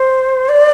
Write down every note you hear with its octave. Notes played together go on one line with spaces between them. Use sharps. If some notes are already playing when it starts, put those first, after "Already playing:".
Already playing: C5
D5